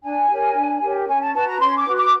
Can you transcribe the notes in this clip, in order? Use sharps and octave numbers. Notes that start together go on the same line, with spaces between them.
D4 G#5
G4 A#4 C#5
D4
G4 A#4 C#5
C#4 G#5
A5
F#4 B4 A5
A#5
C#4 C6
D6
F#4 B4
D6